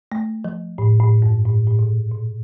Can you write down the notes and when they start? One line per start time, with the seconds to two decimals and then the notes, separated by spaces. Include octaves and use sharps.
0.12 A3
0.45 F3
0.78 A2
1.00 A2
1.22 G2
1.45 A2
1.67 A2
1.79 A#2
2.12 A#2